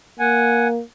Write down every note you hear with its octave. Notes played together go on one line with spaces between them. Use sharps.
A#3 F#5 G#5